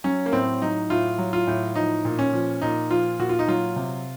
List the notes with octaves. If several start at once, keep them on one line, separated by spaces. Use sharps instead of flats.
F#3 C#4
A#3
A2 C4
F#3 D#4
A2 F4
F#3
F4
A2
F3 D#4
A#2
C#4
F3
A#2 D#4
F3 F4
A#2 F#4
F4
D#4
F#3 F4
C3